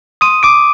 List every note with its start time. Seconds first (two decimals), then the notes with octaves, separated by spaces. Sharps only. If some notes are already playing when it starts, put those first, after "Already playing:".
0.21 C6 D#6 D#7
0.43 D6 D7